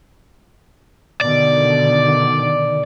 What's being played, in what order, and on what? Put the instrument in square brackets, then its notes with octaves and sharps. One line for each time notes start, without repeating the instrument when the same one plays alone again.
[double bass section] B2 D3 D#3 [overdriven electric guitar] D5